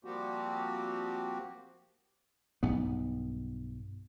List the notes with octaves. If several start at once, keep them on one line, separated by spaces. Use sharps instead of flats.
F3 G3 A#3 C4 F#4 G4
B1 G2 B3